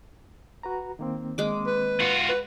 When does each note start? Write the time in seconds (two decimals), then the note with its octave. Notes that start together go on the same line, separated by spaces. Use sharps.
0.63 F#4 B4 A#5
0.99 D#3 A#3 C4
1.38 G#3 D6
1.67 B4
2.01 F4 F#4
2.29 B4